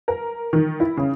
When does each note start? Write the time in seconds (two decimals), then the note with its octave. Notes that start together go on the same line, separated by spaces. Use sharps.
0.08 A#4
0.53 D#3
0.80 E4
0.97 C#3